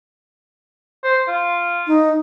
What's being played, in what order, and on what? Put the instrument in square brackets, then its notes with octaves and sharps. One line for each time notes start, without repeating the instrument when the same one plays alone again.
[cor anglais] C5
F4
[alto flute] D#4